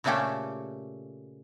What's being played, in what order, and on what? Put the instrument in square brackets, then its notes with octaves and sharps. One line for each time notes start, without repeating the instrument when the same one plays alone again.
[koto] A#2 C#3 A3 C#4 G4 A4